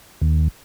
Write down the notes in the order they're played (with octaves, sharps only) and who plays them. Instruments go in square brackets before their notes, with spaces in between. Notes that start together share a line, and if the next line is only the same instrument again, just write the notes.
[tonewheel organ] D#2